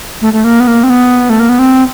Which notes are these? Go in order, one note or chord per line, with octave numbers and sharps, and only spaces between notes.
A3
A3
A#3
B3
A#3
C4
B3
A3
A#3
B3
C4